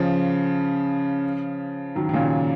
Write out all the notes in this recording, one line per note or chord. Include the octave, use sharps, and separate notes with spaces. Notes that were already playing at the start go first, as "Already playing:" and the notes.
Already playing: C#3 F3
D#3 F#3
D#3
A#2 C#3